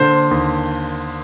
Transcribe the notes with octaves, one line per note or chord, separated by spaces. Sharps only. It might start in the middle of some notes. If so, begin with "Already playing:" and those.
Already playing: A#2 D3 C5
D#2